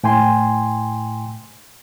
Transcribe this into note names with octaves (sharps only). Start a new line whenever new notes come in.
A2 G5 G#5 C6